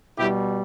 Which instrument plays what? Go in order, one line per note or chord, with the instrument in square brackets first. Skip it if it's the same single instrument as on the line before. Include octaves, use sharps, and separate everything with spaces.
[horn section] B2 G3 E4 G4